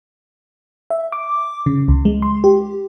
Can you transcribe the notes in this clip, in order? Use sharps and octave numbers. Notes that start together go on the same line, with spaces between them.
E5
D6
C#3
C#2
G#3
C6
G4